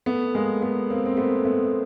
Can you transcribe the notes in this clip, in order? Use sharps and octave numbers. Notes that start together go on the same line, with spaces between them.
A3 B3
G#3 A#3
A3 B3
A#3 C4
C4
A3 B3
A3 B3